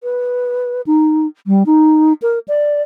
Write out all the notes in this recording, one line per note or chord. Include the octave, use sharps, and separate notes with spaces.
B4
D#4
G3
D#4
A#4
D5